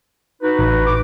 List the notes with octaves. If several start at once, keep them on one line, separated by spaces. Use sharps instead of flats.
D#4 F#4 B4
A1 B5
D6